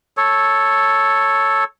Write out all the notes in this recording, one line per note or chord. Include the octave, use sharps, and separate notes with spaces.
A4 C#5